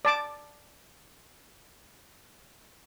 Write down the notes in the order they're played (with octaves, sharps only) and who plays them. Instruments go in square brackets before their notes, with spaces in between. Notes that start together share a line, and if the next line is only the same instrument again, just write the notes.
[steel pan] D5 A5 D6